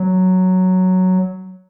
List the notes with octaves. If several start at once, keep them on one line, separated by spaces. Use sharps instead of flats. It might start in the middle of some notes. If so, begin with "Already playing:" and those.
Already playing: F#3